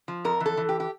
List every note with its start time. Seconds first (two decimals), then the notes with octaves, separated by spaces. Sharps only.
0.08 F3
0.25 F2 A#4
0.40 E3
0.46 A4
0.57 E3
0.69 G4
0.80 G4